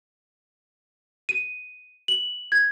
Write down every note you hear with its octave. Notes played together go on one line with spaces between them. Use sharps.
D#7
F#7
G#6